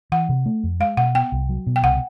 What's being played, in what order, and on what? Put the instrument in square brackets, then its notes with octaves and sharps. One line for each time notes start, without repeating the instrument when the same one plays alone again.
[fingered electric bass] E3 [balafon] F#5
[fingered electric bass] C3
A3
F2
[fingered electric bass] G#3 [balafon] F5
[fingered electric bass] B2 [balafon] F#5
[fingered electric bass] B3 [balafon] G5
[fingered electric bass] C2
F#3
B2
[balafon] G5
[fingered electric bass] C2 [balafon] F#5